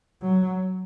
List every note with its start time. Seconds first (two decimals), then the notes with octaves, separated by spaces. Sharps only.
0.22 F#3